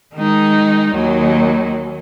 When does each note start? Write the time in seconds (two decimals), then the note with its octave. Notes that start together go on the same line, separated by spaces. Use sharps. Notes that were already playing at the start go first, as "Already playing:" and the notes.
0.15 D#3 G#3 D#4
0.93 D#2 D#3 F#3